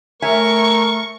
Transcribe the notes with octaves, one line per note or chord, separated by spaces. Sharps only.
A3 A#4 C#5 E5 G#5 C#6